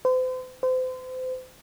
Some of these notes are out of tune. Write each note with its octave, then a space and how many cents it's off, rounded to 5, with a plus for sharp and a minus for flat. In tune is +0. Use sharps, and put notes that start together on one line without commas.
C5 -40
C5 -35